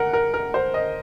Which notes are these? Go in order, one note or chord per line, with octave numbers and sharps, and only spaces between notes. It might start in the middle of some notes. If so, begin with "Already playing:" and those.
Already playing: A#4 F#5
A#4
A#4
C5
D#5